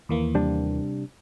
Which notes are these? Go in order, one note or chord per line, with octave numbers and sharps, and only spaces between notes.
D#2 E3 A#3
C3 G3 D4